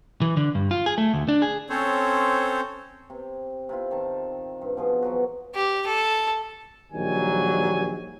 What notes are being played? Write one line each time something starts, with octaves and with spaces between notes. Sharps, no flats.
E3
D3
G2
F4
G#4
A3
D2
D4
G#4
C4 C#4 A4 C5 C#5
C3
C3 E4 F4
D#3 A5
G2
B2 F3 G#4
E3 F#3 F#4
G4
A4
A#1 D#3 F#3 G3 G#5